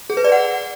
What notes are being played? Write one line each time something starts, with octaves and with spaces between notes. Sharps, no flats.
G#4
B4
D5
F#5